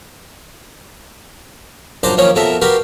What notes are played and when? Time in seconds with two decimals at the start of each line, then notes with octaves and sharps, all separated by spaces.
2.03 A#1 F#2 D4 C5 A#5 D6
2.17 D#3 F3 A#3 C#4 C#5
2.35 F2 B2 A4 A#4 E5
2.62 F#4 G4 A#4 B4 F5